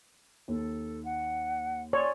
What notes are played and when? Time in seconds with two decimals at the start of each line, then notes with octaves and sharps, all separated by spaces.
0.48 D#2 A4
1.03 F#5
1.93 C#5 D5 G#5 C6